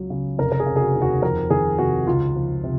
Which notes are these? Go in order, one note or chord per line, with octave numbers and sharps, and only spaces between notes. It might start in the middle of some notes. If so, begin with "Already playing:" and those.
Already playing: C#2 C#3 F#3
C#3
F1 A#4
A#4
G#4
C#3
G#4
F#4
D#2
F#4
F2 A#4
D#3 G#4
C3 F#4
C#2 F4
F3
C3